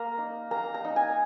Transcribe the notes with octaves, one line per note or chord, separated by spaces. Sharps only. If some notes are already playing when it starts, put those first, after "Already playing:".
Already playing: A#3 A#5
D#4
A#3 A#5
A#5
D#4
G#5